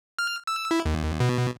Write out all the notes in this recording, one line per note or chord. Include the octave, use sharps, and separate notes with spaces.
F6
E6
E4
D#2
B2